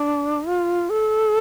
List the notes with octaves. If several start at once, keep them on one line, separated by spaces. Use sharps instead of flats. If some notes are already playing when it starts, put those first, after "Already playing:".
Already playing: D4
F4
A4